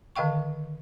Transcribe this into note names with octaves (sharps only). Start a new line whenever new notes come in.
D3 D#3 D#5 F5 G5 C#6